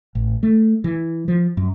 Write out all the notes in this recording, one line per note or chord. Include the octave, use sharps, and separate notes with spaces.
A1
A3
E3
F3
F#2